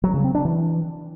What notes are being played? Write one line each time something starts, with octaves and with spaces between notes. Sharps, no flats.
F#3
C#3
C4
D4
E3